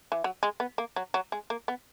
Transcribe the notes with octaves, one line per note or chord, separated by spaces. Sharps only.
E3
F#3
G#3
B3
A#3
F#3
F#3
G#3
A#3
B3